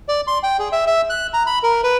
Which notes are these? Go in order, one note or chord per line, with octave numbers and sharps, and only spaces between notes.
D5
C6
G5
G#4
E5
E5
F#6
A#5
B5
A#4
B4